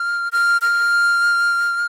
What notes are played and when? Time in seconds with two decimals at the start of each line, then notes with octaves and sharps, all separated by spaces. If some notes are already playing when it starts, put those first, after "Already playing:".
Already playing: F6
0.32 F6
0.62 F6